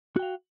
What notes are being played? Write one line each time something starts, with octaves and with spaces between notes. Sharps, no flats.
F#4 F5 G5